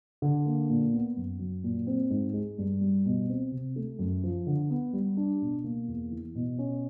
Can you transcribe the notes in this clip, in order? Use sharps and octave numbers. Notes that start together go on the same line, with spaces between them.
D3
A#3
A#2
B3
F#2
F#3
A#2
C4
G#2
G#3
G2
G3
B2
C4
C3
A3
F#2
F3
D3
B3
G3
D4
B2
A#3
E2
E3
B2
C#4